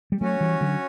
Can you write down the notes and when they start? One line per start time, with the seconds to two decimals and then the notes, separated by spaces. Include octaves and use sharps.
0.12 G3
0.21 F#3 A3 C#4 F#4 C#5
0.41 E3 G3
0.61 D3 F#3